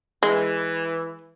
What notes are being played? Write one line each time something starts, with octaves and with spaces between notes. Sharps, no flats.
E3 G#3